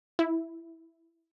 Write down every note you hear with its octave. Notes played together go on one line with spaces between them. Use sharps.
E4